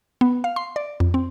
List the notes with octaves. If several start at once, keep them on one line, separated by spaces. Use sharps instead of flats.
B3
F5
C6
D5
F2
C4